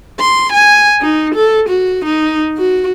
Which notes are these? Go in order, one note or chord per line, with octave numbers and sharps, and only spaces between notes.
C6
G#5
D#4
A4
F#4
D#4
F#4